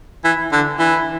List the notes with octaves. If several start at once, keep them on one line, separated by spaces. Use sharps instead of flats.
E3
D3
E3